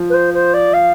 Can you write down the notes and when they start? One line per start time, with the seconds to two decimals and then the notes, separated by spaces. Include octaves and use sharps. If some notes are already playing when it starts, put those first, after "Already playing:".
Already playing: F3
0.10 B4
0.14 C5
0.34 C5
0.54 D5
0.74 F5